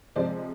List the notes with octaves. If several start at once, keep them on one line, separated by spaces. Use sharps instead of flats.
C3 F3 G#3 C5 D5